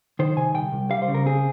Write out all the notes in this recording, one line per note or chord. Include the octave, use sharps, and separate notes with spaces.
D#3 C5
C3 G#5
C2 G5
C2
G3 F5
C5
C#3
A#4
C4 G#4